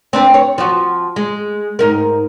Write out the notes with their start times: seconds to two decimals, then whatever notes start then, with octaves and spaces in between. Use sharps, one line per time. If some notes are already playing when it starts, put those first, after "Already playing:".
0.13 C4 D4 B4
0.34 C#5
0.58 F3 F4 F#4
1.16 G#3
1.79 G#2 D#4 A#4